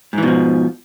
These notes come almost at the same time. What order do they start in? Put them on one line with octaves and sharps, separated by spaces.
G#2 E3 B2 F3